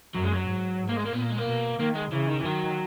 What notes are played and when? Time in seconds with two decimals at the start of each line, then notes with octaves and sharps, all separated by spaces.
0.14 F#2 F#3
0.23 G#3
0.33 F#3
0.47 G#2
0.80 G#2
0.89 A#3
0.96 G#3
1.05 A#3
1.13 A#2 B3
1.22 A#3
1.30 G#3
1.38 A#3
1.46 B2
1.79 D#3 A#3
1.95 G#3
2.11 C#3 E3
2.27 D#3
2.39 E3
2.44 D#3 F#3